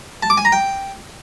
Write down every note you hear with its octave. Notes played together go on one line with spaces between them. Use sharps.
A5
D6
G#5
A#5
G5